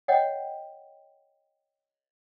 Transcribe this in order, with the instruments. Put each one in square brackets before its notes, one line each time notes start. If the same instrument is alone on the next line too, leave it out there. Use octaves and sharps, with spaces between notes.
[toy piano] C#5 D#5 F#5 G5